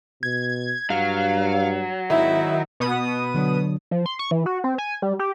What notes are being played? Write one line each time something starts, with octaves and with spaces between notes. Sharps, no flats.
B2 G#6
G2 F#3 F5
G#1 D#3 E4 E5
B2 B3 D#6
D3 F#3 D4
F3
C6
C#6
E3
F#4
C4
G#5
G3
G4